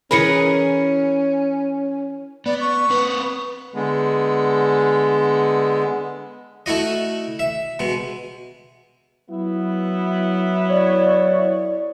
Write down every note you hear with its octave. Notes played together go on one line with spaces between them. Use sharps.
E3 C#4 G#4 A#4 B4 D#5 B5 C#7
B3 D5
C#6
C4 B4
D3 G#3 B3
A3 E4 F#4 D#5
E5
B2 G#3
F#3 B3 E4
C#5 D5